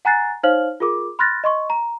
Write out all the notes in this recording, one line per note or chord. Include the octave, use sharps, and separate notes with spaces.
F#5 G#5 A#5 F#6 A6 C7
D#4 C5 C#5 F5 F6 F#7
F4 G#4 A#4 D6
B5 C6 F6 F#6 A6 A#6
D#5 C6 C#6
A#5